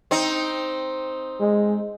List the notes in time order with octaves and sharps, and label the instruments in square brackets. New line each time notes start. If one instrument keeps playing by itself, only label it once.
[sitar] C4 D#4
[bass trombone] G#3